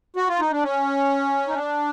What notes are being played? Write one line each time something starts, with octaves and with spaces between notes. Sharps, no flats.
F#4
F4
D#4
D4
C#4
D#4
D4